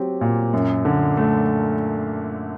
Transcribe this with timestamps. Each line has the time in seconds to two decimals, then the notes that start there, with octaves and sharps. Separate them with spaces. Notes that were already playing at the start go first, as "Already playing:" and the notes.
Already playing: F#3 C4 G4
0.21 A#2
0.53 F#2
0.85 D3
1.17 A3